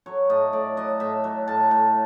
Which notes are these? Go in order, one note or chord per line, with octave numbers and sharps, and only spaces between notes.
F#3 C#5
A2 D#5
A2 D5
F#3 D#5
A2 E5
F#3
A2 A5
A2